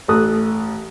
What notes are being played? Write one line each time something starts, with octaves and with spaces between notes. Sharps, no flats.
A1 A4 D#6 F#6